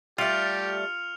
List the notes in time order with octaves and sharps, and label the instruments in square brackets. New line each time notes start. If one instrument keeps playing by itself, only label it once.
[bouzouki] G3 A3 [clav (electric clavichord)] F4 [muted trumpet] G4 [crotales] F6 C#7 F7